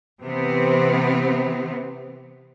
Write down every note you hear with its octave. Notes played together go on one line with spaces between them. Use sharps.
C3 E3 B3 C4